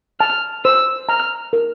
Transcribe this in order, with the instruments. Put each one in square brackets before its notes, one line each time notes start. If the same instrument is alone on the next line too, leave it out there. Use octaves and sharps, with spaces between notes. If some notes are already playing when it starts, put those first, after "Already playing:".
[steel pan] A5 [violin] F6
[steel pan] C5 [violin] E6
[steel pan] A#5 [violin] F6
[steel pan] A#4